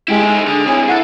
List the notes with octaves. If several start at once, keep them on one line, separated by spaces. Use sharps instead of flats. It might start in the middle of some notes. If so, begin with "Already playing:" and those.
G#3 E4 G4
A3 D#4
D3 G#4
C3 E3 C#5 G#5
E4 G#4 A4 F#5